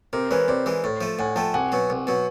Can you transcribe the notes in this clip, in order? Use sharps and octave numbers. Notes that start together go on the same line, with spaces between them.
C3 A#4 C5
E3 G#3 B4 C#5
C3 C5 D5
E3 G#3
A2
F3 A3
A2 F#5 G#5
F3 A3 G5 A5
C2 F#5 G#5
B2 F#3
C2
B2 F#3